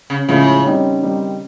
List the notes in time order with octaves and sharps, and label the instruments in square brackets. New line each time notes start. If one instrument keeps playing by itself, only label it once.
[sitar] C#3
[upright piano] A2 F3 G#3 C#4 E4 [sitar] C#3
[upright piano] D#3 G3 C4 D#4
D#3 G3 C4 D#4